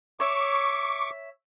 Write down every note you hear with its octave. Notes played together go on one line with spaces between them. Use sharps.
C#5 E5 C#6 D6